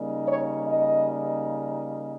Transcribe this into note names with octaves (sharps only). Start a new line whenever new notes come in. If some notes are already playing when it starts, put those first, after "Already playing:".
Already playing: C#3 G3 A#3 D#4
C#5
D#5